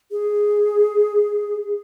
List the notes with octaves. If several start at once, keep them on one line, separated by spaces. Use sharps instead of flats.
G#4